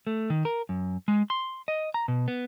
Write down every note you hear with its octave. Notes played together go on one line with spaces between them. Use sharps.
A3
D#3
A#4
F#2
G#3
C6
D#5
A#5
B2
B3